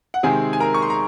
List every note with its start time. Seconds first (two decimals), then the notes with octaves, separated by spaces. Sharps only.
0.14 F#5
0.23 C3 D#3 G#3 C4 G#4 G#5
0.53 G#5
0.60 A#4 A#5
0.74 C#6
0.82 C6
0.90 A#5